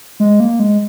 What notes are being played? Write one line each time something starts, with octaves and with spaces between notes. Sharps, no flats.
G#3
A#3
G#3